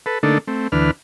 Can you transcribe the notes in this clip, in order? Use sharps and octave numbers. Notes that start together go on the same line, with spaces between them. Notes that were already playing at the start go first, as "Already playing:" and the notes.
A4 B4
D3 A3 A#3 D4 D#4 A4
A3 C4
D2 E3 D4 B4 F6